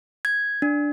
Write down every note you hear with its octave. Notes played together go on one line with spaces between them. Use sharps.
G#6
D4